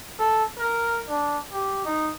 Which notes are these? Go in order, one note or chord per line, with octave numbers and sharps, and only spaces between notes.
A4
A#4
D4
G4
D#4